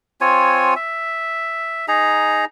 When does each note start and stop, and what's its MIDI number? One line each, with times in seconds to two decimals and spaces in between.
0.21 0.74 60
0.21 0.74 65
0.21 0.74 73
0.21 0.74 80
0.76 1.86 76
1.88 2.45 63
1.88 2.45 68
1.88 2.45 82